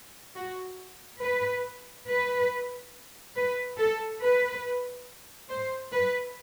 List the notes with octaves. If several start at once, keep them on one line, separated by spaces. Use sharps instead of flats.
F#4
B4
B4
B4
A4
B4
C5
B4